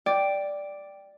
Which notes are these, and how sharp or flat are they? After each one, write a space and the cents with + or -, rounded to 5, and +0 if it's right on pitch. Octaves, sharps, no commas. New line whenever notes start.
D5 +0 G5 +0